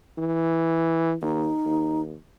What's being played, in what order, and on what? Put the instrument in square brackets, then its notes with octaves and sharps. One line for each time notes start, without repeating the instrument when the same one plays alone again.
[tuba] E3
[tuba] D#2 [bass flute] D#4
[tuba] D#2